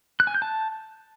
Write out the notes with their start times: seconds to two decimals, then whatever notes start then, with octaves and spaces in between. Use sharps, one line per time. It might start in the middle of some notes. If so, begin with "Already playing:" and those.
0.20 F#6
0.27 G#5
0.35 G6
0.42 A5